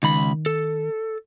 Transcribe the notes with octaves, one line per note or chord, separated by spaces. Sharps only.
C#2 D#3 B5
A4